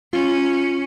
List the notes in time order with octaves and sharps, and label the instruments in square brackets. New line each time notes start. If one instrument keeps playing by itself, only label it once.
[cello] C#4 [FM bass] F4